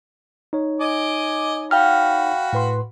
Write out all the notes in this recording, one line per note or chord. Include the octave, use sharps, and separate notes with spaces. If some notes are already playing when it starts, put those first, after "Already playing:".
D#4 C#5
D#5 G#5 D6
F#4 F5 G5 B5 F6
A2 B4 C6